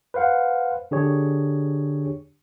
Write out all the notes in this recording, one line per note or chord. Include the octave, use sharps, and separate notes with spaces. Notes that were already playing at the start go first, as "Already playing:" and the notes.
B4 C5 F5 F#5
D3 D4 G4 G#4 C#5